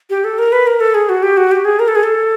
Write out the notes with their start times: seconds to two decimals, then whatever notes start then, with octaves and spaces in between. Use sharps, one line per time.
0.10 G4
0.24 A4
0.38 A#4
0.52 B4
0.67 A#4
0.80 A4
0.94 G#4
1.09 F#4
1.23 G4
1.37 F#4
1.51 G4
1.65 G#4
1.79 A#4
1.88 A4
1.95 G#4
2.03 A4